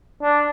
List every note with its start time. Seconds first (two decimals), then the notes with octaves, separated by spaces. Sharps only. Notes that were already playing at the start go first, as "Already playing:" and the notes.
0.23 D4